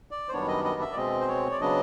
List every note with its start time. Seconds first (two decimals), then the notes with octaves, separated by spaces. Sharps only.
0.11 D5
0.29 C5
0.32 F#2 D#3 G3 B3 D4 C#5
0.48 D#5
0.65 D#5
0.81 E5
0.92 D5
0.96 B2 G#3 C4 D#5
1.21 C5
1.28 C#5
1.51 D5
1.61 C#3 F#3 B3 D4 D#5